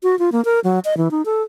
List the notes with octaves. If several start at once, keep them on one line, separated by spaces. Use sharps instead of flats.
F#4
F4
A#3
A#4
F#3
D#5
E3
D#4
A4